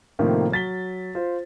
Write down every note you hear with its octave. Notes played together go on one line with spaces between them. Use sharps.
A2 C3 D#3 F3 A#3
F#3 A6 B6 G7
F4 C5